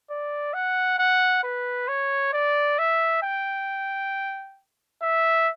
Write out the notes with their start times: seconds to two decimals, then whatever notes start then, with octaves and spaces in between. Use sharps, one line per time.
0.10 D5
0.54 F#5
0.99 F#5
1.44 B4
1.88 C#5
2.33 D5
2.79 E5
3.23 G5
5.02 E5